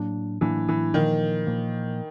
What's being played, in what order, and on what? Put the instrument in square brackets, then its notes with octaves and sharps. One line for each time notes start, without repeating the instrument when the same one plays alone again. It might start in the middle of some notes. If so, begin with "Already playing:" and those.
Already playing: [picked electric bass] A2 F#3 A#3 D4
[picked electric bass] A2 F#3 A#3 D4 [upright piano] E3
[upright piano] E3
[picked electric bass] A#2 F3 A#3 [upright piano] D#3
[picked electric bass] A#2 F3 A#3